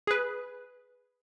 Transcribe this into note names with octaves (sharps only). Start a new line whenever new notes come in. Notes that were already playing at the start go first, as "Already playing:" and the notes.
G#4 B4